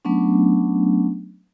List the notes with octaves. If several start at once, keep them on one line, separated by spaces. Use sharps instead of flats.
F#3 A3 B3 C#4 D4